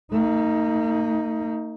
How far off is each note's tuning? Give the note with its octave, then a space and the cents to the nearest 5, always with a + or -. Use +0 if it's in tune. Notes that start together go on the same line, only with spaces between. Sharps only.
A#3 -45 D#4 +10